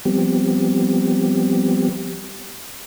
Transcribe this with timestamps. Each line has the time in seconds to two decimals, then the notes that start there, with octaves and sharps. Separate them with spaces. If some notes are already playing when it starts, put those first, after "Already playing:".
0.05 F3 G3 B3 C4 G4